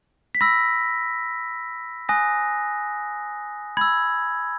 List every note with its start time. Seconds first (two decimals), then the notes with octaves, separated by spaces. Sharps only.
0.35 B6
0.41 B5 E6 A#6
2.09 G#5 D#6 F#6 A#6
3.77 B5 E6 G#6